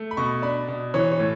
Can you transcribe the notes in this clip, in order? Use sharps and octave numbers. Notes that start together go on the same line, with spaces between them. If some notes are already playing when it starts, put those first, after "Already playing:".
Already playing: A3
B5
B2 C#6
D4 B5
B2
E3 C#5
C#5
A2